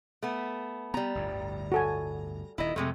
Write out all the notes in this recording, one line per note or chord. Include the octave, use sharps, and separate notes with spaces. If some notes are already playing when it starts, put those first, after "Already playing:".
A3 B3
G3 B3 A#5
G1 D2 A2
F#4 A4 G#5
D#1 D#3 E4 D#5
F2 C3 G#3 A3